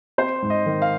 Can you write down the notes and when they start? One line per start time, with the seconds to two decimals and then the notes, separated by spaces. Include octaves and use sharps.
0.18 C4 C5
0.42 G#2
0.50 D#5
0.66 D#3
0.82 F5